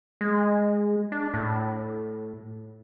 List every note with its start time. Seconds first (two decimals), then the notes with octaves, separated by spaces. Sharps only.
0.21 G#3
1.12 D4
1.34 A2